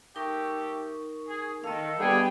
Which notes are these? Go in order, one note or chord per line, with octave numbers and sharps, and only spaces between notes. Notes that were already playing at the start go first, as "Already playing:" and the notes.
A3 D#4 G4 A#4 C#6
G#4
D#3 A4 D#5 F5
D3 G3 B3 G#4 G5